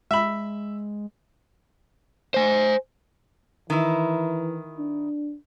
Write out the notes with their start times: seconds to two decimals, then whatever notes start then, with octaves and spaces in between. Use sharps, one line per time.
0.11 G#3 E5 B5
2.34 C5 G#5
3.70 D#3 E3 E4
4.78 D4